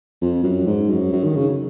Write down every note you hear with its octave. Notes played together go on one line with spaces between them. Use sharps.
F2
F#2
G#2
F#2
F#2
D#3
C#3